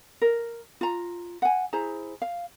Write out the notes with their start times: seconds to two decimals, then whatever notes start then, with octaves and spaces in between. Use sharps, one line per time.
0.22 A#4
0.81 F4 A#5
1.42 F#5 G#5
1.73 E4 G#4 C5 A#5
2.22 F5